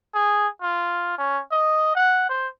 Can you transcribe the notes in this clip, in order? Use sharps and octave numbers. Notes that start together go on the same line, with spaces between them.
G#4
F4
C#4
D#5
F#5
C5